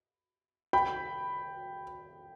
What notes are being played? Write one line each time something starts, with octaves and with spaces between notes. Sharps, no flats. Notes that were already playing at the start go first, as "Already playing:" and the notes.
G5 B5